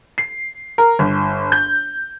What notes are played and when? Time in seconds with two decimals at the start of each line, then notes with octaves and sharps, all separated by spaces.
0.18 C7
0.78 A#4
0.99 G1
1.52 G6